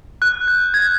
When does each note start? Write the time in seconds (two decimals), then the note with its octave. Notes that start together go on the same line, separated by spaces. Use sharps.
0.22 F#6
0.48 G6
0.74 G#6